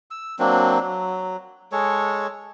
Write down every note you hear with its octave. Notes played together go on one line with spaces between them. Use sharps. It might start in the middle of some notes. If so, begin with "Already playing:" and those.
E6
F#3 A#3 C4 D4
F#3
G#3 A4 C#5